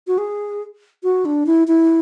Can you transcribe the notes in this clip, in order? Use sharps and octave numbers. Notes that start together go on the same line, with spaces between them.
F#4
G#4
F#4
D4
E4
E4